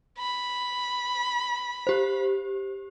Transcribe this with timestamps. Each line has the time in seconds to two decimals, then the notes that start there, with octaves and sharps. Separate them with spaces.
0.19 B5
1.87 G4 C5